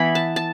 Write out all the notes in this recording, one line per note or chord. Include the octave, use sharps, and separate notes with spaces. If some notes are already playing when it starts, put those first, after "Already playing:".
Already playing: E3 B3 E4 B5
A5
A5